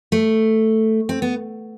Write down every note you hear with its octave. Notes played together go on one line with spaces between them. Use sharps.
A3
C4
B3